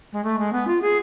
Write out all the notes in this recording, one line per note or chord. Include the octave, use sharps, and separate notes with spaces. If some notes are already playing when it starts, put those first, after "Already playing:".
G#3
A3
G#3
B3
F4
G#4